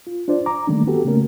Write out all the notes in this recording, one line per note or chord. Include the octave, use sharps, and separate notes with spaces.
F4
D4 F4 C5 D5
A#5 D6
D#3 G3 A3 A#3 C#4 D4
B3 F#4 G4 A4
C#3 A3 A#3 C#4 A#4